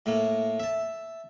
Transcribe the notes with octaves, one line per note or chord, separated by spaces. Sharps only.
A2 A3 A#3
E5 A5